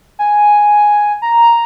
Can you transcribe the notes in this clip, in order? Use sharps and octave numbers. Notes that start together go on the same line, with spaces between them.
G#5
A#5